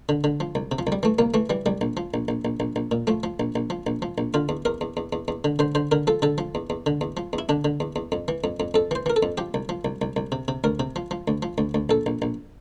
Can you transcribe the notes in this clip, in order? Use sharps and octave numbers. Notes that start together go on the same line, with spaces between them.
D3
D3
F3
C2
C3
F3
C2
G3
E3 A3
C2 A#3
E3 A3
E3 G3
C2 G3
A#1
F3
A#1
A#1
A#1
A#1
A#1
A#2
F3 A3
F3
A#1
A#1
F3
A#1
F3
A#1
D3 F4
E2
E2 A#4
E2
E2
E2
E2
D3
D3 C5
D3 C5
D3 A#4
F3 A4
D3 A4
F3
E2
E2
D3
E2
F3
E2
E4
D3 D4
D3
E2
E2
F2
E3
F2
F2
F2 A4
E3 C5
E3 A#4
A4
F2
F3 G4
C2
F3
C2
C2
C2
C3
C3
D2 A#4
C3
F3
F3
D2
F3
D2
D2
A#1 A4
A#1
A#1